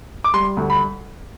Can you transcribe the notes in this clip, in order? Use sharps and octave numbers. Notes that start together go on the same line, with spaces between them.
D6
G3 C6
D2
B5